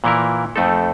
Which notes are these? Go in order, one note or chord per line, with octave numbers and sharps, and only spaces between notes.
A#2 E3 E4 A#4
F2 A3 D#4 A4